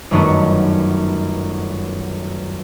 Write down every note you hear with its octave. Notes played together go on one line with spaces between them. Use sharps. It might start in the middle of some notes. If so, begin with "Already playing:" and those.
G1 F#2 D#3 A3 B3 F#4